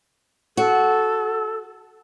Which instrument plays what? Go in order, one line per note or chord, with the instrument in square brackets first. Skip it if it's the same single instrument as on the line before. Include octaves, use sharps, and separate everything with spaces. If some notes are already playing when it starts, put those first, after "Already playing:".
[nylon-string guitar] F#4 [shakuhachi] A4